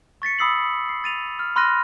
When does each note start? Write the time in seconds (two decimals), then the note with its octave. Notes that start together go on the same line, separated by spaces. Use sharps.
0.22 C#6 A6 B6 C#7
0.39 B5 D#6 E6 C7 F#7
0.89 C7
1.04 A6 D#7 F7
1.39 F6
1.56 B5 C6 F6 F#6 A#6 D#7